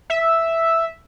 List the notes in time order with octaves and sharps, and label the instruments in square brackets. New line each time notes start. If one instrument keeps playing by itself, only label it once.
[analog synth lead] E5